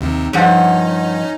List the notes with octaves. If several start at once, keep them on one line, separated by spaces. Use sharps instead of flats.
D#2 C3 D#3
G2 F3 C#4 D#4 F#5